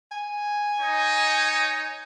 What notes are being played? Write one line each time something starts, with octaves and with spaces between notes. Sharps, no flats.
G#5
D#4 C#5